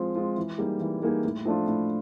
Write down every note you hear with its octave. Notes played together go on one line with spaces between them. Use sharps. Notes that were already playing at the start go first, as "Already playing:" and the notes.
Already playing: F3 G#3 C4 F4
G#3 C4 F4
E3
G3 A#3 D#4 G#4
E3
G3 A#3 D#4 G#4
A2
F3 A3 D4 F4
A2